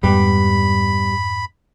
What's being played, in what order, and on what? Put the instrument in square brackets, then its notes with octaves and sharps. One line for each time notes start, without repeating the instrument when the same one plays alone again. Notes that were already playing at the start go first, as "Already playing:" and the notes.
[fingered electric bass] F2 G#2 G#3 [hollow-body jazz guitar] G3 B3 G4 [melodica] B5